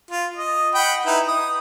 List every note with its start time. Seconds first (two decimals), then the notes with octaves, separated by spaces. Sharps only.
0.11 F4
0.36 D#5
0.75 F#5 G5 B5
1.06 D#4 E4 B4
1.28 D#6